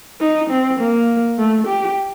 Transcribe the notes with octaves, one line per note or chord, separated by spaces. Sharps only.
D#4
C4
A#3
A3
G4